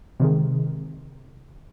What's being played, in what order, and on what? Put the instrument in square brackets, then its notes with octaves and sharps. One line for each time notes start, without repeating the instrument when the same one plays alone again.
[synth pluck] C3 D#3 G#3